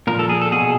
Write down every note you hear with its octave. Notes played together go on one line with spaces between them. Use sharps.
A#2 F3 A#4
A4
G#4
A4
B2 G#4